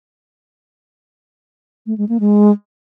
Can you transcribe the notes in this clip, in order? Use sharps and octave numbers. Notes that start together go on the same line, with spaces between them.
A3
G#3
A#3
G#3